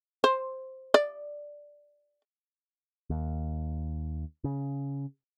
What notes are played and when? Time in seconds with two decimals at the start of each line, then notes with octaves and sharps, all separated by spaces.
0.24 C5
0.94 D5
3.10 D#2
4.44 C#3